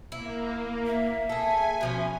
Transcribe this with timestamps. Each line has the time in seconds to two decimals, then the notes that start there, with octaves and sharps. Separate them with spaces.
0.12 A#3 E4
0.86 E5
1.29 G#4 A4 G#5
1.81 B2 F3 C#4